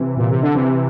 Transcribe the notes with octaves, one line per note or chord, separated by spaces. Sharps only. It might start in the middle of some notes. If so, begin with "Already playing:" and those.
Already playing: C3 E3
A#2
C3
D3
C3 E3